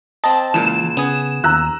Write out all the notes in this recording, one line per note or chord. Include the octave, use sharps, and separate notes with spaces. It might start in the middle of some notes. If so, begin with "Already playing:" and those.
C4 D#5 A5
C#2 A#2 E3 E7
C#3 B3 G#4
D#2 A#5 E6 F#6